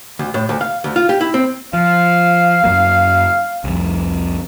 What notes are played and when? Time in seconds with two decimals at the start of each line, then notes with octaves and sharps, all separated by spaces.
0.19 D2
0.34 A2
0.49 D2
0.61 F5
0.84 D2
0.96 F4
1.09 G4
1.21 E4
1.34 C4
1.73 F3 F5
2.64 F#2 F#3 A#3
3.64 C2 F2